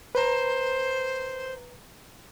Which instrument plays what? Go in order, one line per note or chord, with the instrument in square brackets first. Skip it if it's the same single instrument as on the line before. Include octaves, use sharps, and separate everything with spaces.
[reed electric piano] B4 A#5 [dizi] C5